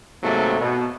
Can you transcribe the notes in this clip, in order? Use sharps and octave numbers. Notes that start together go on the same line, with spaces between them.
G#2 C3 F#3 A3 A#3
B2